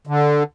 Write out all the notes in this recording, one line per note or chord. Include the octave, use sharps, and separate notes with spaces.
D3